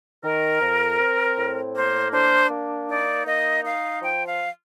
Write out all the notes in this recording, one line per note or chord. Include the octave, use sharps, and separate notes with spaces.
D#3 A#4
F2
C4
A2
A#3 C5
D4 C5
A#3
D#4 D5
A#3 D#5
D#4 F5
F3 G5
F5